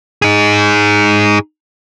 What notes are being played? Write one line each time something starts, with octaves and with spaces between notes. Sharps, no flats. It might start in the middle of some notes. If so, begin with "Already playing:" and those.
D#4 G#4